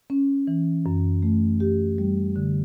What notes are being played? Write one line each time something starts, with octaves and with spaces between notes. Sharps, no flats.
C#4
E3
F#2
A3
G4
G3
D3